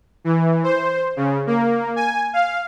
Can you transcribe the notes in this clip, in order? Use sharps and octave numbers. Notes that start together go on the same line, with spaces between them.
E3
C5
C#3
A#3
G#5
F5